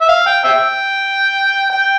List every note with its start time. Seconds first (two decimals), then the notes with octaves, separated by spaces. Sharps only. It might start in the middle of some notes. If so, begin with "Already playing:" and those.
0.01 E5
0.08 F5
0.27 G5
0.44 E5 G5
1.70 G5